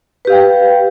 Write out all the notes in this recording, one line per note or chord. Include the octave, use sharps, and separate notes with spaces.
G4 B4 F5 G5